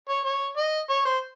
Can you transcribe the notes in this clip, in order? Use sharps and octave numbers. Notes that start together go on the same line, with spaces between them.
C#5
C#5
D#5
C#5
C5